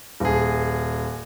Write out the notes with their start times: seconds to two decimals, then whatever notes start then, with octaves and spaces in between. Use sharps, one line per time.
0.20 D#1 G#4